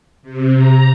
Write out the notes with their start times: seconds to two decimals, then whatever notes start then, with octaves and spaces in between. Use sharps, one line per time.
0.23 C3
0.54 A#5